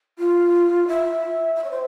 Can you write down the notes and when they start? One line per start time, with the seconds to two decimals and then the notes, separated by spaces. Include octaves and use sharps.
0.19 F4
0.88 E5
1.56 E5
1.64 C#5
1.71 C5